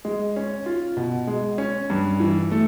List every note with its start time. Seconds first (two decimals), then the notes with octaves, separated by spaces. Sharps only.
0.05 G#3
0.36 C#4
0.66 F4
0.97 B2
1.27 G#3
1.58 C#4
1.90 G2
2.20 E3
2.52 A3